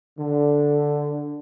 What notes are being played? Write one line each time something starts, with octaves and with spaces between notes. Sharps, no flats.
D3